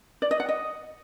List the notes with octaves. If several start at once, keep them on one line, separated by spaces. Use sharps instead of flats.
D5
D#5
F#5
D#5